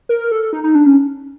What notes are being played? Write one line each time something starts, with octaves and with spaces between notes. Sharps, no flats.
A#4
A4
D#4
D#4
D4
C#4